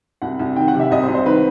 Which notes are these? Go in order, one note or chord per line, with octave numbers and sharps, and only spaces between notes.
C2 F#5
C2
D#3 G5
F#5
C3
E5
C2 D#5
C5
C2
C5
D#3 B4